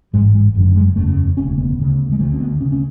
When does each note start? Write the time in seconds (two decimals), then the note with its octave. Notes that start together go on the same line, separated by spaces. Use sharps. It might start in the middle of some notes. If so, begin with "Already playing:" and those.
0.13 A1 G#2 G#3
0.34 G#3
0.55 F#1 F#2 D3
0.75 G#3
0.96 F#1 E2 C#3 A3
1.37 E1 D2 C#3 C#4
1.57 B3
1.79 D2 C#3
2.12 G#3
2.19 D2 D3 A3
2.33 C#4
2.40 B3
2.61 D2 C#3 C#4
2.72 C#4